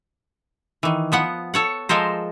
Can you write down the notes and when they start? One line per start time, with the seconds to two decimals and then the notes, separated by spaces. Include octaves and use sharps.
0.83 D#3 E3
1.12 F3 B3 F#5
1.54 A4 C#5 F#5
1.89 F3 G#3 A4 A#4 C5